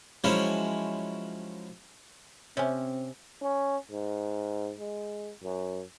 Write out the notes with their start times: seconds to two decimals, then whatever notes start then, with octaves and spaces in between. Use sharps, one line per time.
0.24 F3 F#3 G#3 C#4 E4
2.57 C3 C4 C#4 C#5 G#5
3.42 C#4
3.91 G#2
4.80 G#3
5.43 F#2